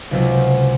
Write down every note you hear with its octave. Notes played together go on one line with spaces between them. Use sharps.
C#2 C3 F#3 C4 F4